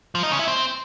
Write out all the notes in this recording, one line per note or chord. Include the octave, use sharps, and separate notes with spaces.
F3
D#4
C#3
E4
C4